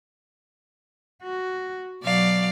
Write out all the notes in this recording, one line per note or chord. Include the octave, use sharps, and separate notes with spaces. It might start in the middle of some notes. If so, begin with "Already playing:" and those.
F#4
B2 F#3 D5 F5